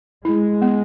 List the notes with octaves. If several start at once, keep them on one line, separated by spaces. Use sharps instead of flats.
G#3 E4
B3